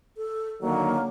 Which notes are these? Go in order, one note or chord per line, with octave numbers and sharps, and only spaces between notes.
A4
D3 D#3 F#3 A#3